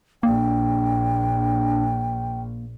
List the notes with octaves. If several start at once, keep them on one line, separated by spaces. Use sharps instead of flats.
A#1 A#3 D4 G5